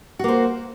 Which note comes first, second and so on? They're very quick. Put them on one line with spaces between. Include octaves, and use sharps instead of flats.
F#4 A#3 C5